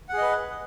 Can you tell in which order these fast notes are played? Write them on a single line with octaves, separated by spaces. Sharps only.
F#5 G#4 D#5 B4